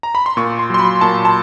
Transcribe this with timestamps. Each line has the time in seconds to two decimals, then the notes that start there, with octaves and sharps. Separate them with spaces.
0.03 A#5
0.15 B5
0.26 C6
0.37 A#2 C#6
0.59 C6
0.70 F#3 C6
0.79 B5
1.01 A#2 A5
1.25 A5